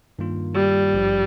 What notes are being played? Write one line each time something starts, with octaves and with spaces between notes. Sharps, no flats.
G2 D#3 A#3 F4
G3
G#1 G2 F3